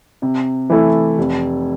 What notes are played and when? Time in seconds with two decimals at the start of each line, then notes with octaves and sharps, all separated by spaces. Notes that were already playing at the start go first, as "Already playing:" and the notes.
0.22 C3
0.70 E3 A3 E4
1.18 F1